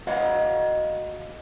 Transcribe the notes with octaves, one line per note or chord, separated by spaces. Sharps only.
F#4 D#5 F5 F#5